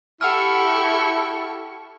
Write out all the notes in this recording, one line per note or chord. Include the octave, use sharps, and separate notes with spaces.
E4 G4 A4 F#5 C#6 E6 F6